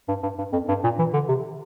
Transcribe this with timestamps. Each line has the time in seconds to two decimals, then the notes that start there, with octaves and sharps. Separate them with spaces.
0.08 G2
0.23 G2
0.38 G2
0.52 F2
0.68 G2
0.84 A#2
0.99 E3
1.13 D3
1.28 C3